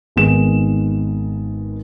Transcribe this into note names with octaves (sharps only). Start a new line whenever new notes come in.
G#1 D#3 G#3 B3 E7